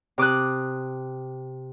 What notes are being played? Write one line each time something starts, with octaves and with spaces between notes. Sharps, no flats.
C3 D6 D#6 F#6